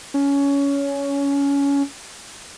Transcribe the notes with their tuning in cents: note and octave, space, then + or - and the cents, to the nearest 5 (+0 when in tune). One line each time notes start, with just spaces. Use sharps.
C#4 +20